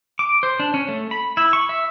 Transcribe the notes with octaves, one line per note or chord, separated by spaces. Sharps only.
D6
C5
D4
C#4
A3
B5
E4
C#6
E5